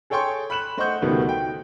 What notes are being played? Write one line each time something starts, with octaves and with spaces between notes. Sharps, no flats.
G#4 A4 C#5 G5 C6 C#6
B5 F#6 E7 F#7
A3 C5 D#5 F#5 C#6 G6
C#2 B2 D#3 G3 A3 B3
G5